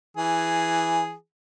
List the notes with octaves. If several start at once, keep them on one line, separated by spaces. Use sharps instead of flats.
E3 G#4